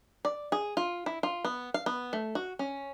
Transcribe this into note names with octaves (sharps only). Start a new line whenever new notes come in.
D5
G#4
F4
E4
F4
B3
F5
B3
A3
F#4
C#4